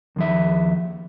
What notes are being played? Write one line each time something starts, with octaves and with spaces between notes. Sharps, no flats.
D#2 F3 E5